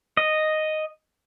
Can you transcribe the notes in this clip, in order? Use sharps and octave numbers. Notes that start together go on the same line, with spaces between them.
D#5